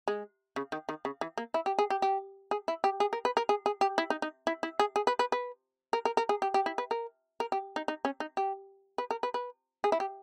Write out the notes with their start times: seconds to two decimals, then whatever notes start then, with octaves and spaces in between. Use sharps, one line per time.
0.08 G#3
0.56 C#3
0.72 D#3
0.89 D#3
1.05 C#3
1.21 E3
1.38 A#3
1.54 E4
1.66 G4
1.79 G#4
1.90 G4
2.02 G4
2.51 G#4
2.68 E4
2.84 G4
3.00 G#4
3.13 A#4
3.25 B4
3.37 A#4
3.49 G#4
3.66 G#4
3.81 G4
3.98 E4
4.10 D#4
4.22 D#4
4.47 E4
4.63 E4
4.79 G#4
4.96 G#4
5.07 B4
5.19 B4
5.32 B4
5.93 A#4
6.05 A#4
6.17 A#4
6.29 G#4
6.42 G4
6.54 G4
6.66 E4
6.78 B4
6.91 A#4
7.40 A#4
7.52 G4
7.76 D#4
7.88 D#4
8.05 C#4
8.20 D#4
8.37 G4
8.98 B4
9.11 A#4
9.23 B4
9.34 B4
9.84 G#4
9.92 E4
10.00 G4